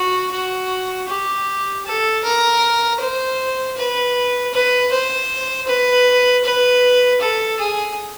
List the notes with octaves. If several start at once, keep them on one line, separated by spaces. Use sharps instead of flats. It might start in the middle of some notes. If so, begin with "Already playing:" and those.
Already playing: F#4
F#4
G4
A4
A#4
C5
B4
B4
C5
B4
B4
A4
G#4